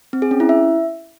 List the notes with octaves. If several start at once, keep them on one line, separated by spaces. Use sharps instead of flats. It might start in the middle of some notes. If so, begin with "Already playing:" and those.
C4
G#4
C#4
E4
E5